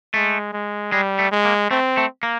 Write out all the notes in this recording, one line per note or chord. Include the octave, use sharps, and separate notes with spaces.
G#3 A3
G#3
G3 G#3
A3
G#3
A#3
A3 C4
A3
A#3